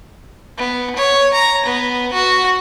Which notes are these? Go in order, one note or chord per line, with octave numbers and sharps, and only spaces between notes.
B3
C#5
A#5
B3
F#4